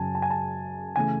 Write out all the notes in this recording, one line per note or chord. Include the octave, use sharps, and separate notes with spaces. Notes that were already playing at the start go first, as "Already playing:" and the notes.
Already playing: F#2 C#3 F#3 G#5 A5
A5
G#5
A5
C#3 E3 A3 G#5